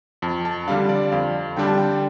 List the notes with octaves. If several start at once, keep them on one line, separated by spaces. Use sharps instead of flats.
F2 A5
A5
D3 G3 D4 F5
D5
F2 F5
D3 G3 D4 G5
A5
G5